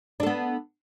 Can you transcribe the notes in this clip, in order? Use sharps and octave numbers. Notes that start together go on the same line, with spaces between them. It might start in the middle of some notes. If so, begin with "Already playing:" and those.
B3 D4 A4